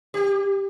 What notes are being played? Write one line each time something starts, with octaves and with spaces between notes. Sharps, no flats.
G4